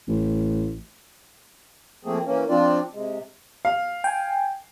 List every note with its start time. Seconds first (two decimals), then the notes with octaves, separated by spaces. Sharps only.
0.08 A1
2.05 F3 A3 A#3 C4 G#4
2.26 E3 A#3 C#4
2.49 F3 C4 D4 F4 D5
2.93 C3 G#3
3.65 F5
4.04 G5 G#5